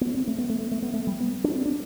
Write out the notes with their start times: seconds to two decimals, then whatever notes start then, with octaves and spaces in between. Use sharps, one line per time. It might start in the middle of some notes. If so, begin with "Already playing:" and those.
0.01 B3
0.14 C4
0.27 A3
0.38 B3
0.49 A3
0.61 B3
0.71 A3
0.82 B3
0.93 A3
1.07 G3
1.20 B3
1.44 D4
1.55 C4
1.66 D4